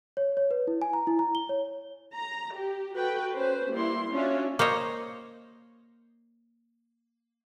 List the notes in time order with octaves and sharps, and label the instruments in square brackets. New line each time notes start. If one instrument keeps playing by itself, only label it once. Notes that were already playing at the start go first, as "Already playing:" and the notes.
[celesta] C#5
C#5
B4
E4
G#5
A#5
E4
A#5
G7
C#5
[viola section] A#5
G4
F#4 A4 B4 G5
C#4 B4 C5
G3 A#3 E4 C6
C#4 D4 F4 F#4 C#5 E5
[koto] A#3 C5 C#5 D#5